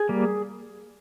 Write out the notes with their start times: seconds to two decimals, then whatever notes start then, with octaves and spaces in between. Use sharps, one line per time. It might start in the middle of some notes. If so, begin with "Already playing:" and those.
Already playing: G#4
0.09 G3 A#3